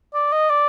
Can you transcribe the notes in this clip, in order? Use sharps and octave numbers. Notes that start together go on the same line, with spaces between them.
D5
D#5
D5